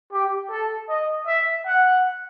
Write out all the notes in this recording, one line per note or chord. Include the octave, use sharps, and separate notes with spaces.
G4
A4
D#5
E5
F#5